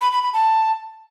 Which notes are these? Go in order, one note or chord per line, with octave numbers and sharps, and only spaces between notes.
B5
B5
B5
A5